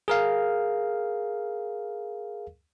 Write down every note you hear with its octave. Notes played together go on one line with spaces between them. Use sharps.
G#4 A#4 F5